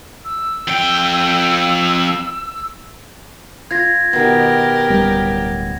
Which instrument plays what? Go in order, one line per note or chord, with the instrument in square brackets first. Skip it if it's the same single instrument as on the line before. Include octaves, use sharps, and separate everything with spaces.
[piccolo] E6
[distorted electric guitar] F2 G5
[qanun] F4 [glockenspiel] G#6 A#6
[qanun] B2 D#3 [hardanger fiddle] G4 A#4
[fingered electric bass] D1 G3 C#4